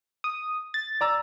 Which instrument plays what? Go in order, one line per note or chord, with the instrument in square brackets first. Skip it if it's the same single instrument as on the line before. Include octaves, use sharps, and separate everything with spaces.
[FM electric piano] D#6
A6
[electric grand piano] D5 A#5 E6